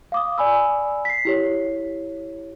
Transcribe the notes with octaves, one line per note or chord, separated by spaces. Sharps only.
F5 D6 D#6
D5 G#5 B5 E6
B6 C7
E4 G4 C#5